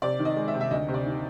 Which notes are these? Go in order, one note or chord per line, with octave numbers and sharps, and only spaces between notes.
C3 D5
D#3
D#5
G#3
E5
C3
E5
D2 D#5
C3
D5
D#3